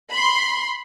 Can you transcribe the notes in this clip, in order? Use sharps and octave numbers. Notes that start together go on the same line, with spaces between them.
B5 C6